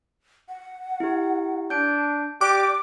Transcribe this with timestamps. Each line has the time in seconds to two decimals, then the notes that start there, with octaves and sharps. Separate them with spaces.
0.49 F#5
1.00 E4 G4
1.70 D4 G6 D7
2.41 G4 D5 D6 F#6